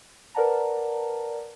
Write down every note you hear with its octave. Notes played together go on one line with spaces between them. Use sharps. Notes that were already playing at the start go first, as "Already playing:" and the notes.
A#4 B4 D5 F#5 A5 A#5